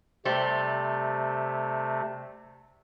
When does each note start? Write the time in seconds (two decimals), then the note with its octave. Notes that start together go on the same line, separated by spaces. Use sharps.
0.25 C3 G3 A3 C5